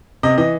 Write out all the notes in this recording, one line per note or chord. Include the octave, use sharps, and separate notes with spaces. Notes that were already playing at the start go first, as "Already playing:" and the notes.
C3 D#5
E3 D#5